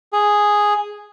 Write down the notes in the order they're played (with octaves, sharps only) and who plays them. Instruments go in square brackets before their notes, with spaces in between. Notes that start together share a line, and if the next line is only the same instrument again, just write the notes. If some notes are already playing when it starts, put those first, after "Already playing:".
[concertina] G#4